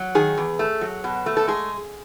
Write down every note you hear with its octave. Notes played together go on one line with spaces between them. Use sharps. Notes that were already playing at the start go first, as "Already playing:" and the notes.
Already playing: F#3
D#3 G#4
E2
A3
F#3
B2
A3
A4
G#3 G#4